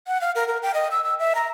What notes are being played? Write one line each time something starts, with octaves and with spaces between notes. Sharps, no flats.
F#5
F5
A#4
A#4
G5
D#5
E6
E6
E5
A#5